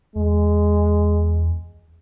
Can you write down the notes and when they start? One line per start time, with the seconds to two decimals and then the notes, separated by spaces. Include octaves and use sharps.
0.16 E2 G#3